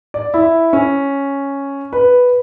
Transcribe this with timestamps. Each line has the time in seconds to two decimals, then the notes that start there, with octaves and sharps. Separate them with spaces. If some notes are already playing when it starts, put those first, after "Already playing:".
0.14 D5
0.34 E4
0.73 C#4
1.93 B4